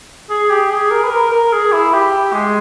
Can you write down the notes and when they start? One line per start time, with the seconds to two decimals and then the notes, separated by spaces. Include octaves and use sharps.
0.30 G#4
0.50 G4
0.70 G#4
0.91 A#4
1.04 B4
1.11 A#4
1.32 A#4
1.53 G#4
1.72 E4
1.93 G4
2.33 G#3